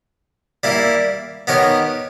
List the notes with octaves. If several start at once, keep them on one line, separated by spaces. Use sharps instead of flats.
G3 A#3 E4
B3 D#4 G4 A#4 C#5